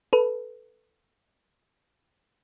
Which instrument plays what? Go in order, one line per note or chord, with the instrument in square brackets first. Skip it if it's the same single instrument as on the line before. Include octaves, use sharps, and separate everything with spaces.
[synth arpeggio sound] A4 B4